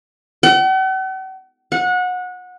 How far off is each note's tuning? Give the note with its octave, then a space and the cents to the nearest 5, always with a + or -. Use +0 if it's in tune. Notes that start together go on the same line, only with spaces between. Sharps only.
F#5 +45
F#5 -25